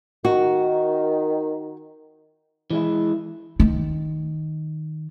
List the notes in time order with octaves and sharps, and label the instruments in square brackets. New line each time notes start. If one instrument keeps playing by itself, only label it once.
[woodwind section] D#3 [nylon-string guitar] F#4
[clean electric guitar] E3 G#3 E4
[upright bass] D#3